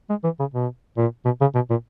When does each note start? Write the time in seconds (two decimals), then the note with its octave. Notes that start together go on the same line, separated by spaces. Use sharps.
0.09 G#3
0.24 E3
0.40 C#3
0.54 B2
0.97 A#2
1.25 B2
1.41 C#3
1.55 B2
1.70 A#2